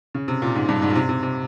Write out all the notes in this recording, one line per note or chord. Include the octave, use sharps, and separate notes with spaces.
C#3
C3
A#2
G#2
G2
G#2
A#2
C3
C3
C3